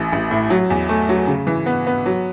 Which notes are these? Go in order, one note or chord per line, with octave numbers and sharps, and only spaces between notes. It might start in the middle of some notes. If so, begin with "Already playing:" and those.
Already playing: A1 E3
A1
A2
F#3
E2
A3
F#3
C#3
E3
B3
B3
F#3